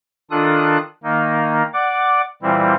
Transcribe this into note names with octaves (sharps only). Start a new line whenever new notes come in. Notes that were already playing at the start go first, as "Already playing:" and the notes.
D#3 D4 F4 A4 D#6 F#6
D#3 A#3 D#4
D5 F#5 D6
A#2 E3 G3 C4 E4